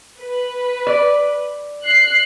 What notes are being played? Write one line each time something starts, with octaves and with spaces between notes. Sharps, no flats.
B4
D5
F#6 C7